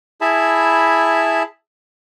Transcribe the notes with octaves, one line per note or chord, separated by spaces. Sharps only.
E4 G#4 E5 A5 B5